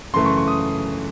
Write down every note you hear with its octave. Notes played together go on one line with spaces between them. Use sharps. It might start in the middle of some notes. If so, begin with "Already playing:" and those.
F#2 C#3 E3 A3 C6
C#6
C#6
D#6